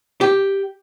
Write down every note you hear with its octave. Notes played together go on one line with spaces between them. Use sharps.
G4